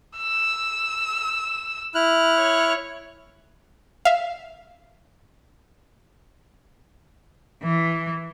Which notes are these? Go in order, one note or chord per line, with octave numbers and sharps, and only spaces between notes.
E6
E4 F6 F#6
C#5
E5 F5
E3